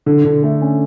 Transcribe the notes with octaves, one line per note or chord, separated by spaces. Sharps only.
D3
D3
A3
C#4